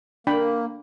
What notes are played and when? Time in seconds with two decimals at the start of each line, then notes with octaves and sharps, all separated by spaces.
0.27 A#3 D4 G5 B5